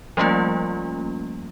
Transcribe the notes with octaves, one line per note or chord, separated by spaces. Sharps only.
F3 G3 A3 A#3 C#4 F4